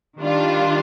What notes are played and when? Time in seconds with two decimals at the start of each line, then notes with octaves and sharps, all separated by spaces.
0.18 D#3 G3 D4 F4